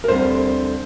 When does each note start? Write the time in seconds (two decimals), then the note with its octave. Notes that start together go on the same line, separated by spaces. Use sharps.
0.04 A#4
0.08 D2 D3 G3 C4 C5